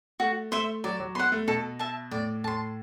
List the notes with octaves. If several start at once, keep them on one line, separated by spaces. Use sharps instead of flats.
A3 F#4
A3 C5 E5
F#3 D5
F#3
B3 F#5 C6
A3
B2 A4
E5 A5
A2 D5
A2 A5 C6